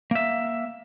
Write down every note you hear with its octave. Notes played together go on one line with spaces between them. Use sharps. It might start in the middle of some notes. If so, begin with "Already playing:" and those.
A#3 E5